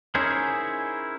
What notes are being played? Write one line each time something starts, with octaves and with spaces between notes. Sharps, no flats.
C#4 D#4 E4 G#4 A#4 C5